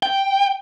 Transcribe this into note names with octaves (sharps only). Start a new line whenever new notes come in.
G5